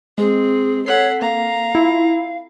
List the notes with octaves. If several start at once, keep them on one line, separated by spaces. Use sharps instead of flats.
G#3 C4 G#4
A4 C#5 F#5 B6 C7
A#3 F5 A#5
E4 F4